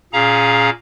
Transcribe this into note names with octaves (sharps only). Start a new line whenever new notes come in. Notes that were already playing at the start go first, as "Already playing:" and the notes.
A#2 C#4 G#4 F5 A#5